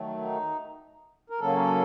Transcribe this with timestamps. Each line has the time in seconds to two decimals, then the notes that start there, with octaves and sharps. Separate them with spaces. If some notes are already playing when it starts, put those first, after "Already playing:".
Already playing: D#3 F#3 A3
0.22 D#4
1.30 A#4
1.40 C#3 F#3 A#3 C#4 A4